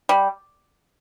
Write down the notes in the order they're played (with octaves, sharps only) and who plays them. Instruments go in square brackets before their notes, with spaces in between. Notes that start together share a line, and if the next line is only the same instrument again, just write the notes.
[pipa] G3